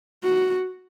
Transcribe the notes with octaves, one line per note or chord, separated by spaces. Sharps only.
F#4